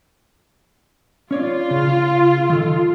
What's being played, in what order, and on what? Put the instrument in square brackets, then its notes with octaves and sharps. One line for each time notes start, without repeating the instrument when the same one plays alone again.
[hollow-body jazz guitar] C#4 C#5 D5 [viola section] F4
[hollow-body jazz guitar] C#3
D#3 A4